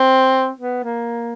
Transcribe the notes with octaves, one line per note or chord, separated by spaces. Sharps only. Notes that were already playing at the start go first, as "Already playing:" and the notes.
Already playing: C4
B3
A#3